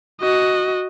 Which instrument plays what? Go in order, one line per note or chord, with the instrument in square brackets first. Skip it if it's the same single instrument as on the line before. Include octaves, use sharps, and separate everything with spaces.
[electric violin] F#4 D#5